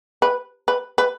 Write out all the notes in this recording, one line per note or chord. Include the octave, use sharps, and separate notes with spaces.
B4
B4
B4